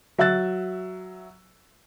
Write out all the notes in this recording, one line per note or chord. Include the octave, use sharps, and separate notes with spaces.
F#3 E5 E6 F#6 A6